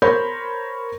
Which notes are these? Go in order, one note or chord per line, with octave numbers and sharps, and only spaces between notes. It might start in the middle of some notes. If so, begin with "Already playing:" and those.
A#4 C5 C#5 B5 G6